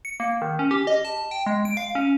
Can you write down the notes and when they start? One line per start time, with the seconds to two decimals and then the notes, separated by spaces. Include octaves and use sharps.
0.05 C#7
0.20 A#3
0.42 D#3
0.59 C#4
0.71 G4
0.87 D#5
1.05 A5
1.31 G5
1.46 G#3
1.65 D7
1.77 F5
1.95 C#4